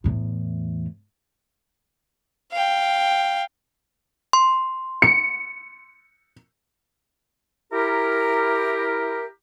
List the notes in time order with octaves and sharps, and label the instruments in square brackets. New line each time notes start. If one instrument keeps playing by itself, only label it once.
[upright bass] E2 A2
[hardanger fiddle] F5 G5
[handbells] C6
[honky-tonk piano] C#7
[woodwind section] E4 G4 A#4